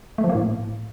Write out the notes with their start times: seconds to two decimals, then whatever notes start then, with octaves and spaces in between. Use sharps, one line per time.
0.18 A3
0.24 F3
0.30 A#3
0.35 A2